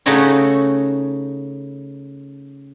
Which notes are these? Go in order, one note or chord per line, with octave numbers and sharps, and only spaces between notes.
C#3 A3 D#4 F#4 C#5